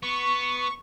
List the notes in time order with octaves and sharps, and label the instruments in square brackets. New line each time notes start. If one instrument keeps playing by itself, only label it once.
[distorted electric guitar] B3 [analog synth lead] C#6